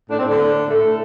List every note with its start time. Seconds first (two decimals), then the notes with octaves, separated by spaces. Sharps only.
0.10 A2 D4
0.18 C4
0.24 A2 D3 D4
0.39 A2
0.54 A2
0.68 A2 A3 A4
0.83 A2